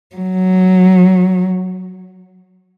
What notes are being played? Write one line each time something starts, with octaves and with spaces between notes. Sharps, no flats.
F#3